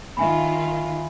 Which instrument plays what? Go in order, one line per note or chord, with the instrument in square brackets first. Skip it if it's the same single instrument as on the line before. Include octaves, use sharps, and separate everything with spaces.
[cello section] D#3 F4 [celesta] E5 G#5 B5